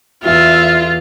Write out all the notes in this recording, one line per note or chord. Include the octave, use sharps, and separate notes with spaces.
E2 F4 E5